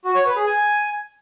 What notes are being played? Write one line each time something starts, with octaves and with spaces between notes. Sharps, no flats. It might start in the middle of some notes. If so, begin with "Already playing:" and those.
F#4
C#5
B4
G#4
G#5